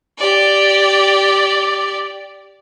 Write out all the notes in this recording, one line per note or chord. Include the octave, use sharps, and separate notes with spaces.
G4 D5